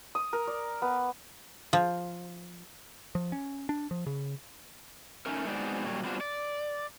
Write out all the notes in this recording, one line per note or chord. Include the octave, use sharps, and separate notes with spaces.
D#6
A#4
D5
B3
F3
F3
C#4
D4
F3
C#3
A3 C#4 D#4 A#4
G#3 B3 C4 D#4 F#4 D5
A#2 F#3 G3
G3 B3 C4 D4 F4 F#4
D5